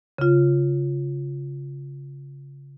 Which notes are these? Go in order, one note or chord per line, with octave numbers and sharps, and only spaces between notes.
C#3 F4